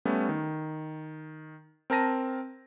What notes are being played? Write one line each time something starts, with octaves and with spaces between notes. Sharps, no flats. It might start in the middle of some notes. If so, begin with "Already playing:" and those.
G3 A3 B3 C#4
D#3
C4 A#4 A5 A#6 D#7